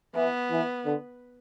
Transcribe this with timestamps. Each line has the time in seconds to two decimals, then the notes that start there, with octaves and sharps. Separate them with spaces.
0.15 E3 B3
0.50 E3
0.84 D3